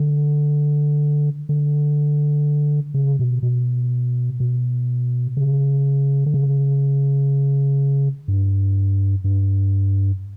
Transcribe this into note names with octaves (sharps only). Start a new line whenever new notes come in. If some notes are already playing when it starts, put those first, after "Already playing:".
Already playing: D3
D3
C#3
B2
B2
B2
C#3
D3
C#3
G2
G2